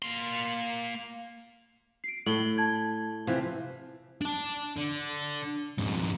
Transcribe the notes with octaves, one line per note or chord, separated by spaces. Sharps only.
A#3 C6
C7 D7
A2 A3 F#7 G7
A5 G#6
C3 E3 F3
D4 A5
D3
F2 G#2